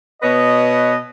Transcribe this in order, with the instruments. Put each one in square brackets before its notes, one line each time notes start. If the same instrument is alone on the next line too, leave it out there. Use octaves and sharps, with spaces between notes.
[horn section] B2 B4 C#5 D#5